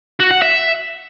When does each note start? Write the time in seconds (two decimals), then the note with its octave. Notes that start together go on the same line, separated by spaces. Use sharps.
0.20 F#4
0.31 F#5
0.42 E5